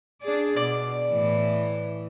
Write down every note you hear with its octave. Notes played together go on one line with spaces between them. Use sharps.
D4 G#4 D5
B2 D5
A2 E3